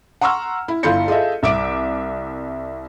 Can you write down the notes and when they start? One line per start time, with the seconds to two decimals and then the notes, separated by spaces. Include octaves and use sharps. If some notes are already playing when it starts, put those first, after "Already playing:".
0.21 F#5 A#5 C6 C#6 E6 F6
0.68 E4
0.83 G1 E4 F4 C6 G6 C#7
1.08 F4 G#4 A4 D#5 E5
1.43 C2 E5 D6 D7